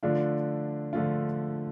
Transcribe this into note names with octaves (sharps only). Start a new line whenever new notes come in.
D3 F3 A3 D4 F4
D3 F3 A3 D4 F4